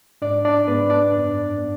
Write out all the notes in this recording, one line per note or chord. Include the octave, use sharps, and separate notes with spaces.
G#2 D4 D5
D4 D5
G#2 B3 B4
D4 D5
F#2
B3